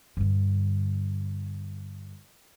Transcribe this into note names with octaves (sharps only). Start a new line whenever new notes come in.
G2 D3